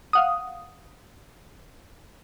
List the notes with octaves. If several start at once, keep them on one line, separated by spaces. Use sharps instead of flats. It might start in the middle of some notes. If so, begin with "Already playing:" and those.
F5 F#5 D#6